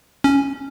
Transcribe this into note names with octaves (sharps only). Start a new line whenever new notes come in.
C#4